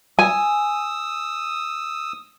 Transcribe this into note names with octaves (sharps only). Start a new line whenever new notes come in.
G#5 D#6 E6